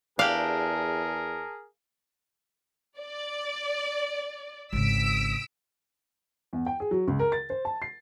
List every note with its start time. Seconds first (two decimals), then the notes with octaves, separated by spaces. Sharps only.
0.19 E2 D4 G4 G#4 A#4 F5
2.99 D5
4.73 G#1 C#3 E6 B6 D7
6.53 E2
6.66 G5
6.80 G#4
6.91 F#3
7.08 C#2
7.19 A#4
7.32 A6
7.50 C5
7.65 A5
7.82 C7